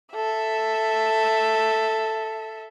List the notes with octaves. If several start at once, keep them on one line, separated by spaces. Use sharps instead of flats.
A4 E5